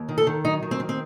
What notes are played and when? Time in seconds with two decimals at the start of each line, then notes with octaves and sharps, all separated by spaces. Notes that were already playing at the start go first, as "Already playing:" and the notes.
Already playing: D#2
0.09 D#3
0.18 A4
0.27 D#3
0.45 F#3 D#4
0.63 D#3
0.71 C4
0.80 D#3
0.89 C4